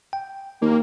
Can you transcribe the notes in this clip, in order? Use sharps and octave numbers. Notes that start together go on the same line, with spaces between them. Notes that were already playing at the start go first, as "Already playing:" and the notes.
G5
D#2 A#3